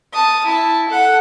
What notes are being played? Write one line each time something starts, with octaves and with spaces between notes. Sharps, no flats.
A5 D#6
E4 A5
A4 F#5